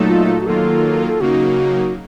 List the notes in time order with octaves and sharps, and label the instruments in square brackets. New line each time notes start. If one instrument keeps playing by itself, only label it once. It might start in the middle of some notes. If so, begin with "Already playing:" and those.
Already playing: [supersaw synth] A#2 F#3 A3 D#4 A4
[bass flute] F4
F4
F#4
[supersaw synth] D#3 F#3 A#3 F4 [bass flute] A4
[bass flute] A4
[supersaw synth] C#3 F#3 A#3 D#4 [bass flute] F#4